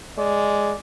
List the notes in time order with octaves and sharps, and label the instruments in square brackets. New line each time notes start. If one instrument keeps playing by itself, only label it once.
[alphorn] G#3 [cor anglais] D5